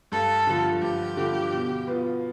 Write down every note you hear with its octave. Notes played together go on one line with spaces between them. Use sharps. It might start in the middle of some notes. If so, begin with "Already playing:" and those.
G2 A4
D3 F3
G2 G4
D3 F3
B2
B3 F4